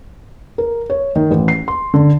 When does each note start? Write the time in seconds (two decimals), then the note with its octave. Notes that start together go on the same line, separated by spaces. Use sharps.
0.58 A#4
0.90 C#5
1.16 D#3
1.31 A1
1.48 C7
1.68 C6
1.94 D3